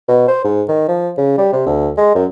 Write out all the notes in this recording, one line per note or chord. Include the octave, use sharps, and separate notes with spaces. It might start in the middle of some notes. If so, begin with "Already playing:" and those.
B2
C5
G#2
D#3
F3
C#3
G3
C3
D2
G#3
F#2